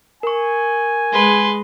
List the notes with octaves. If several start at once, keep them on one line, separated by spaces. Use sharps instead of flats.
A#4 G#5 C#6
G#3 B4 C6